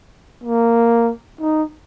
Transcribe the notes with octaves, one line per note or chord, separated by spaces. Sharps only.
A#3
D#4